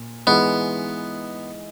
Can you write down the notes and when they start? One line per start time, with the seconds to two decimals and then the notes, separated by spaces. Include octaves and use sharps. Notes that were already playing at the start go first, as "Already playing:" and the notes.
Already playing: A#2
0.27 E3 G#3 B3 D#4